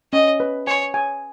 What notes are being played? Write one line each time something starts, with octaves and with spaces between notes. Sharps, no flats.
C#4 D#5
B4
C#5 G#5
G#5